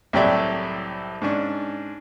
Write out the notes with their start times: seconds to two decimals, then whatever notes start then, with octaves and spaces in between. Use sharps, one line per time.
0.13 C2 A2 F#3 G4 D5 E5
1.22 G#2 C#4 D4